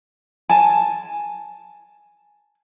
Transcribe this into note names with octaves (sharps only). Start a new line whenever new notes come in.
G#5 A5